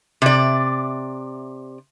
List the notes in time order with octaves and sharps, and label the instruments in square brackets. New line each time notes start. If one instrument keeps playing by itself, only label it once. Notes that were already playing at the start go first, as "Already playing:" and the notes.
[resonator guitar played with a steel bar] C3 D5